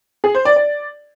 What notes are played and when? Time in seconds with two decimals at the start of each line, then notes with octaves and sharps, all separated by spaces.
0.24 G#4
0.35 C5
0.45 D5
0.56 D5